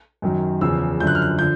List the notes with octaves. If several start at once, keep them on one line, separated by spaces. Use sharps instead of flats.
F#2 D#3 F#3
E2 C#3 F3 E6
F#2 D3 F3 G6
F#6
F6
F#6
D3 F3 G6